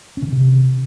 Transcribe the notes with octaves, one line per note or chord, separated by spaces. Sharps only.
C#4
C#3
D3
C3